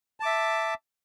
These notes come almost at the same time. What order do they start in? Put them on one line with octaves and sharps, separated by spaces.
A5 D6 E5